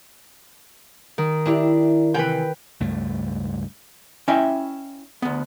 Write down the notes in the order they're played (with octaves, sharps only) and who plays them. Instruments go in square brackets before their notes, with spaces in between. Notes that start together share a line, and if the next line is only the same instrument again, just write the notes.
[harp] D#3
[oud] D4 E4 G4
[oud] C3 E3 [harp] B4 G5
[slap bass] C#2 G2 A3
[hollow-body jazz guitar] C#4 E4 D#5 E5 G5
D2 B3